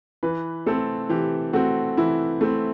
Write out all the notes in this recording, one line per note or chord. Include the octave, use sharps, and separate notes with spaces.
E3 B4
A3 C4 A4
E3 G4
A3 C4 F#4
E3 E4
A3 C4